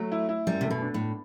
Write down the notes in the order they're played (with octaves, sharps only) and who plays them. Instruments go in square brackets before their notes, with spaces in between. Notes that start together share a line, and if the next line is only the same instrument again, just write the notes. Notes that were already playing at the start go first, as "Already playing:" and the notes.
Already playing: [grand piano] F#3 [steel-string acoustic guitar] A3
[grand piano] E4
E4
[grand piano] F#2 [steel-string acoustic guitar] G3
[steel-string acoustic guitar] C3 [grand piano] A3
[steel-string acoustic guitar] B2
[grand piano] D4
[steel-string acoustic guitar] A2